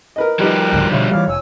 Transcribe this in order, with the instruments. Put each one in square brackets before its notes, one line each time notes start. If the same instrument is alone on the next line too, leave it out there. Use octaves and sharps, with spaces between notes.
[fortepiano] A#4 B4 D#5
[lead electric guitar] F3 G3 [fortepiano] D#4 G4 B4 [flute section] A#4 G5 F#6
[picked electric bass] C#2 G#2 D3
[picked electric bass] B2 D3 [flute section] C#5 E5 F5
[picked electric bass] E3 G3 [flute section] C#5 D6 [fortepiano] F5 F6
[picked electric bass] F1 [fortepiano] C#5 [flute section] G#5 E6